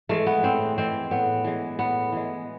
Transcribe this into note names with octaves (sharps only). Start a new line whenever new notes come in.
E3 G#3 A3
B3
A2 C4
E3 G#3 C4
A2 B3
E3 G#3
A2 B3
E3 G#3